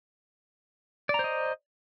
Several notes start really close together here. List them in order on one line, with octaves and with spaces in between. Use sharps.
D5 A#5 C5 D#5